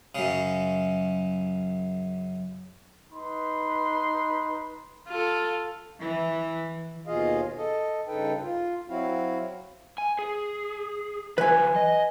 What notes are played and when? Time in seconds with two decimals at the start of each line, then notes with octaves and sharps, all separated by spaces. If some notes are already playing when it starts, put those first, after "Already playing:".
0.15 F#2 C#3
3.12 D#4 B4 B5 C6
5.08 F4 A4
6.00 E3
7.07 D#2 B2 F4 G#4 D#5 F5
7.58 A4 D#5
8.07 G2 C#3 D#4 A4 B4 G5
8.41 F4
8.89 F#3 C4 E4 F#4 F5
9.98 G#5
10.19 G#4
11.38 E3 F#3 B4 G#5
11.76 D#5